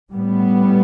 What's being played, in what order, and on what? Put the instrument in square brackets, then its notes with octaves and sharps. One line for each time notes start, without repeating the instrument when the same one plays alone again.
[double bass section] A2 G3 B3